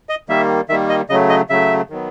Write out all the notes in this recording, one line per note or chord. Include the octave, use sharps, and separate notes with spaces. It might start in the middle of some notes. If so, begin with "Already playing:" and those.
D#5
D#3 G3 A#3 E5
D#3 G3 A#3 E5
D#5
C#3 F#3 A3 D#5
D#5
C#3 F#3 A3 E5
D#3 F#3 B3